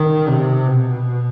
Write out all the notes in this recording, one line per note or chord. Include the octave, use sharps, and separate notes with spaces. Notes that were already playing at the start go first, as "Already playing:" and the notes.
Already playing: D#3
C3
B2